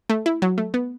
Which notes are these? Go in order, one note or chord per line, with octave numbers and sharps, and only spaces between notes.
A3
E4
F#3
A3
B3